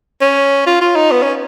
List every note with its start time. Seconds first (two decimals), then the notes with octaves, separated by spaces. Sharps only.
0.22 C#4
0.67 F4
0.81 F4
0.96 D#4
1.12 B3
1.23 C#4